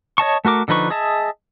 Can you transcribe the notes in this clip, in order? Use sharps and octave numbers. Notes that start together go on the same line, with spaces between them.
C#5 D#5 A5 C#6
A3 F#4 A#4 D6
D3 F3 D#4 B4 C#6
G#4 D#5 E5 A5